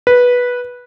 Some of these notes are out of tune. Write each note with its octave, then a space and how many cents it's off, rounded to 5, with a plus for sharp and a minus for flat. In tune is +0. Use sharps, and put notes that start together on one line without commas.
B4 -10